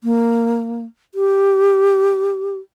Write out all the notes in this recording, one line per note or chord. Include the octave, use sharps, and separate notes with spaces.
A#3
G4